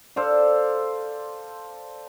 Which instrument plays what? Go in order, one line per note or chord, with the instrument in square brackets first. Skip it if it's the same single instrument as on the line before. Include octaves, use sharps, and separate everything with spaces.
[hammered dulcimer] A4 C5 D5 F5